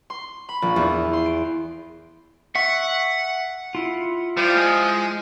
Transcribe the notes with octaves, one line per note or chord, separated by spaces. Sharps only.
C6
B5
A#1
E2
C6
D7
E5 F#5 C#6
E4 F4
F3 G3
G#3